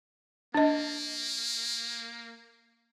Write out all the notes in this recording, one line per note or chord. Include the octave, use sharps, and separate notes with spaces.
A#3 D4 D#5